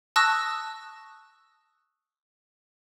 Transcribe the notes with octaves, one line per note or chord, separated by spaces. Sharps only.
A5 C#6 D#6 E6 F#6 A#6